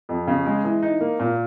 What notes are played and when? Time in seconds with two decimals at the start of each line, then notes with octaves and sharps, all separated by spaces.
0.09 F2
0.27 C#3
0.46 G#3
0.64 E3
0.83 D#4
1.01 A#3
1.20 A#2